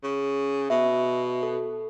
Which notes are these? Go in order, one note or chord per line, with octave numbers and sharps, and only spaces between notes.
C#3
B2 E5
A4